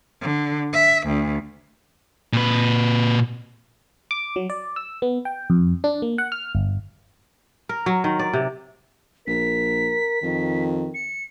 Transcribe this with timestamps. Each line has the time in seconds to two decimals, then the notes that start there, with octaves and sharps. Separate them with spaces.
0.22 D3
0.73 E5
1.07 D2
2.33 A#2 B4
4.11 D6
4.36 F#3
4.50 D5
4.76 E6
5.02 B3
5.25 G5
5.50 F2
5.84 D4
6.02 A#3
6.18 F#5
6.32 F6
6.55 G1
7.69 A#4
7.86 F#3
8.04 D#3
8.19 D5
8.33 C3
9.27 A#1 A#4 B6
10.22 F2 D#3
10.95 C#7